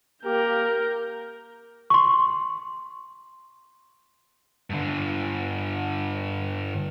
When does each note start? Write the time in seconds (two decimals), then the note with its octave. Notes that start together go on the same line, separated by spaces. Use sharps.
0.25 A#3 G4 A#4 G6
1.90 C6 C#6
4.70 G2 D3